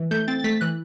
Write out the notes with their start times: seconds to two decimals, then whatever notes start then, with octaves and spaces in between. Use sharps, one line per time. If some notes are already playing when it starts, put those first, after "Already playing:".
Already playing: E3
0.11 A3 G6
0.28 C4 A6
0.40 A6
0.44 A3 B6
0.61 E3 F#6